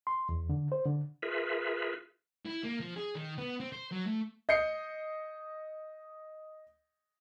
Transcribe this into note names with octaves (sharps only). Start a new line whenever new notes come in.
C6
E2
D3
C5
D3
F4 G#4 A#4 B4 E5
E4
A#3
F3
G#4
D#3
B3
C4
C5
F#3
A3
D#5 G6 C7 C#7